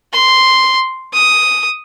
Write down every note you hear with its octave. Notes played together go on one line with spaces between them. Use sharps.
C6
D#6